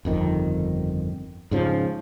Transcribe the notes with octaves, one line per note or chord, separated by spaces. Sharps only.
G1 F2 D#3
G#2 C#3 F3